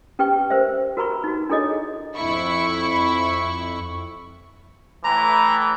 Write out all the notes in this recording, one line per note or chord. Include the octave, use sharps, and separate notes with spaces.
C#4 G4 B4 G5 C#6
A#4 C5 E5
F#4 A#4 B4 A#5 B5 C#6
D#4 F#4
D4 E4 G#4 A4 C#5 D#5
F2 E4 C#6
A2 E3 A#5